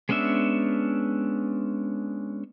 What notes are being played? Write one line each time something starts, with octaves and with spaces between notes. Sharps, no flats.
G#3 B3 C#4 D4 E5